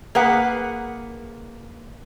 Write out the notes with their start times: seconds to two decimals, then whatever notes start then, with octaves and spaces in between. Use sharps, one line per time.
0.15 A#3 G#4 B4 F#5